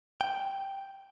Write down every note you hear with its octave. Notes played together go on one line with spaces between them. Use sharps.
G5